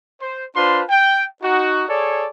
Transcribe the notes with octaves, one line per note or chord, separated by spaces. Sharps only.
C5
D4 F4 B4 C5 A5 C6
G5
D#4 F#4
G#4 A4 C#5 D5